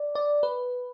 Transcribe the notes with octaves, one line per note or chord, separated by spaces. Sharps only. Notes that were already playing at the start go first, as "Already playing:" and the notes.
Already playing: D5
D5
B4